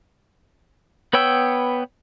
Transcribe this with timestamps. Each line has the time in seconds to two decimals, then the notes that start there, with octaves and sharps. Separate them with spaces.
1.13 B3 B4 C#5 G5 E6